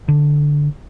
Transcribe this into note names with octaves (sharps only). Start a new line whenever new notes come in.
D3